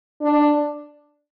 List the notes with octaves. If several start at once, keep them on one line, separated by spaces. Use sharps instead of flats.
D4